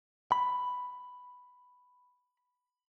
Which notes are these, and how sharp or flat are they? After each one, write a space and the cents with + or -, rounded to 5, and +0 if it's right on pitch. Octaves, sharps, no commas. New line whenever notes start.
B5 +5